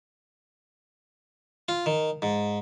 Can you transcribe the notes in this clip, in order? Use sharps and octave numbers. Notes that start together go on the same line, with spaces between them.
F4
D#3
G#2